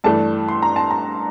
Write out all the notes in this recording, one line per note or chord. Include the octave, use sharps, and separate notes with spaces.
G2 E3 A3 D4 A5
C6
A#5
A5
A#5